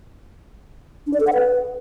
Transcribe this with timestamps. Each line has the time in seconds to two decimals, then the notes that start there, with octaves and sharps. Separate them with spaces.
1.07 D4
1.13 D5
1.20 A4
1.27 F#5
1.34 B4